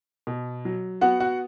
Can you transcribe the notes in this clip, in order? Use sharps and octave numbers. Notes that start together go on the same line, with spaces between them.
B2
F#3
B3 F#4 F#5
F#4 F#5